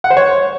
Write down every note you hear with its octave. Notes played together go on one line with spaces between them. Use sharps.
F#5
C5
C#5